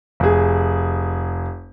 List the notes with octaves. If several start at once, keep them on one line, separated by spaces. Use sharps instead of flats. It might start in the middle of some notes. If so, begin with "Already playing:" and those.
F1 G#4